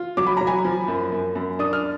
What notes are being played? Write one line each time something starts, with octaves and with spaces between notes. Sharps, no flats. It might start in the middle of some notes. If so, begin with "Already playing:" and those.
Already playing: F4
F#3 D6
B5
F#3 A#5
G#5 B5
F3
F#2
F#2
F#2
D4 D#6
F6